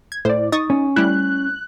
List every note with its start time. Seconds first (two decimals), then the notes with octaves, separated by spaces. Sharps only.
0.12 G#6
0.25 A2 C5 D5
0.52 D#4 C#6 D#6 A6
0.70 C#4
0.96 G3 A3 E4 F#6